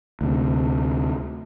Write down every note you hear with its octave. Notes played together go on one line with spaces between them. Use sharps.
D2 C3